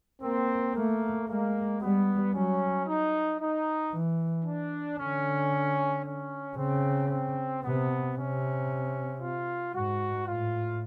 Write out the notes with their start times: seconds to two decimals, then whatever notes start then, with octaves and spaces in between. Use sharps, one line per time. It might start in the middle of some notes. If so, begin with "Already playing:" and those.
0.22 A#3 C4
0.75 A3 A#3
1.28 G#3 A#3
1.81 G3 B3
2.34 F#3 C#4
2.87 D#4
3.41 D#4
3.93 E3
4.45 D4
4.98 D3 C#4
6.05 C#4
6.57 C#3 C4
7.10 C4
7.63 C3 B3
8.16 C3 C#4
9.22 F4
9.75 G#2 F#4
10.27 A2 F4